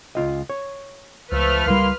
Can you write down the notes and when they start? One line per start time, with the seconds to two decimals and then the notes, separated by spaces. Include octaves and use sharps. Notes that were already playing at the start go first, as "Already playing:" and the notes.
0.15 C#2 F4 D#5
0.50 C#5
1.32 C#2 F3 A3 B4 F6
1.66 C#2 G3 A#3 E4 C6